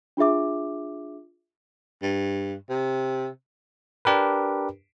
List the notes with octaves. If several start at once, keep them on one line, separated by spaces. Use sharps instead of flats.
D4 F4 G#4 E5 D6
G2
C3
D4 G4 A#4 B4